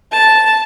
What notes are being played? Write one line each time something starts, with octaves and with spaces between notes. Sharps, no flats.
A5